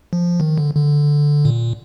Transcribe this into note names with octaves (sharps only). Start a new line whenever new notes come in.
F3
D#3
D3
D3
A#2